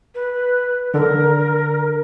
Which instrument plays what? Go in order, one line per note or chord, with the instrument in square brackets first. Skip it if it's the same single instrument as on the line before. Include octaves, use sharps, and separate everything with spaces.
[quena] B4
[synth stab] D3 [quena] A#4